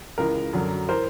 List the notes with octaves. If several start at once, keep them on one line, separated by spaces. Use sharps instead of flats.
C#2 C#3 E3 A#4
F#2 D3 F#3
E3 A#4 C5